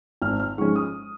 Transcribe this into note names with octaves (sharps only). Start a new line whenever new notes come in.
G#1 F6
F6
G#2 F3 G#3 C#4 C#6
D#6